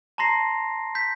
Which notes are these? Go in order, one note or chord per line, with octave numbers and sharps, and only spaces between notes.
A5 A#5 C6 A#6 C7
G6 B6